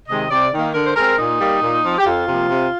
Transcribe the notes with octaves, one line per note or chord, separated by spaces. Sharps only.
C3 D#3 G#3 D#5
C3 D5
D#3 A#3
D3 A#4
C5
G#3 C4 A#4
A#2 D#4
G3 A#3
A#2
F3 C4
G4
F2 F4
C3 F3 A#3
C3